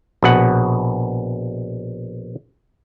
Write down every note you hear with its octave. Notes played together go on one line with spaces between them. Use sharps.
A#1 B2 F#5